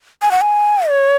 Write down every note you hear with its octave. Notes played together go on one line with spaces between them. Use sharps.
G#5
F#5
G#5
C#5